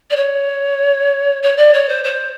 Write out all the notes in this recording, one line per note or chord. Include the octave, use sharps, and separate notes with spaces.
D5
C#5
C#5
D5
C#5
C5
C5